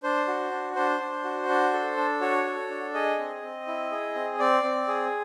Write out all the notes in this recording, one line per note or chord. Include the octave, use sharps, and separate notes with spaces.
D4 C5
F#4
D4
D4 C5
D4
F#4
D4
A4
D4
F#4 C#5
A4
D4
G#4 D#5
C4
C4
E4
G#4
C4
C4 D5
C4
G#4